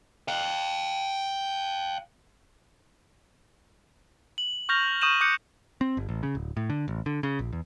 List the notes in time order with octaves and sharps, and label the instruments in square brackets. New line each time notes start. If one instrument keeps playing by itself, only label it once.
[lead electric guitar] F5 G5
[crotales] F#7
C#6 F6 G6 A#6 F7
C#6 D#6 G6 D#7 E7 F#7
D6 D#6 F#6 G6 C#7
[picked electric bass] C4
G1
A1
C#3
D1
A2
D3
A1
D3
C#3
A#1
E2